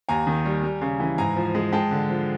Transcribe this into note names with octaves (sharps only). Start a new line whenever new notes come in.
D#2 G#5 A#5
D#3
G3
G3
C#3
E3
G#2 G#5 A#5
F3
G#3
G#3 G5 A5
D3
F3